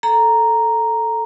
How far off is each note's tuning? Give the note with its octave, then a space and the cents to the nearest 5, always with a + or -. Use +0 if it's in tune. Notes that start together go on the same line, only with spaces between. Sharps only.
A4 +0 A#5 +0